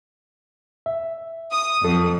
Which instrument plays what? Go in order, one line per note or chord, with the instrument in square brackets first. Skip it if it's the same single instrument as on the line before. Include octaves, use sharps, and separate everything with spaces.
[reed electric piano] E5
[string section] D#6
[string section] F2 [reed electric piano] A4